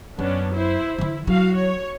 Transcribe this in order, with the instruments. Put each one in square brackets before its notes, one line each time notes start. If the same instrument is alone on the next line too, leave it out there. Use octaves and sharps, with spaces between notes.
[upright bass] F#2 [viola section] B3 C#4 D4
[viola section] E4 C5
[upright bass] D3 E3 [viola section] E4
[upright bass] F#3 E4 [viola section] F#4 F5
[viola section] C#5